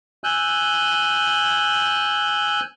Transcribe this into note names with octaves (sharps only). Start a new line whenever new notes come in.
G#5 E6 F#6 G6